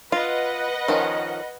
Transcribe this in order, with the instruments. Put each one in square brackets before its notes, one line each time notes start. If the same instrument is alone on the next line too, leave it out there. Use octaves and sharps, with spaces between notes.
[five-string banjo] F4 [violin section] B4 D#5 F#5
[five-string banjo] D#3 F3 C#4